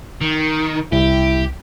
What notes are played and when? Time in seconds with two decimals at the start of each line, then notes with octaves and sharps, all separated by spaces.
0.21 D#3
0.92 C2 E4 G4